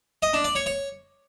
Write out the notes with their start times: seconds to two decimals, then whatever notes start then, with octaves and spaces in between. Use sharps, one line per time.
0.22 D#5
0.33 D4
0.44 D5
0.55 C#5
0.66 C#5